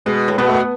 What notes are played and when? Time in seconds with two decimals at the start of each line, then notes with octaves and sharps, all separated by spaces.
0.06 B2 G#3
0.28 A2
0.38 B2 B3
0.47 A3
0.54 B3